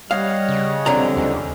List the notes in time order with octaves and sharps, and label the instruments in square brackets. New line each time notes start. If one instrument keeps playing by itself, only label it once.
[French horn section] G3 [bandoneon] C#5 D#5 F#5 [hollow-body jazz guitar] F5
[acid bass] C#3
[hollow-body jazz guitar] C#2 D3 A#5 [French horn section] F3 G3 C4
[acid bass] D#2 [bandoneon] C#4